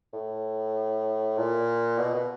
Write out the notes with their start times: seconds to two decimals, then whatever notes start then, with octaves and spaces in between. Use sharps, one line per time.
0.13 A2
1.37 A#2
1.98 B2
2.14 B2